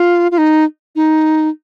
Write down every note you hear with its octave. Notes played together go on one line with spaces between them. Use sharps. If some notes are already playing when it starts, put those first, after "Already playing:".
Already playing: F4
F4
D#4
D#4